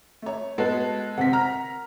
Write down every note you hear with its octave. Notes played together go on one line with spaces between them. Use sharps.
A3 C#5
G#3 B3 F#4 A4 A5
C3 C4 A#4 F#5 B6
A#5 F6